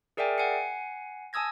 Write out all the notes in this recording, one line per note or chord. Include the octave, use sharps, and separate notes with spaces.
G#4 A#4 D5 E5 G5 G#5
F#5 G#5 C7 C#7
G#5 A5 D#6 E6 G#6 A#6